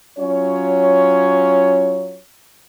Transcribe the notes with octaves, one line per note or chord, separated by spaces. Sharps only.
F#3 C#4 F4 C#5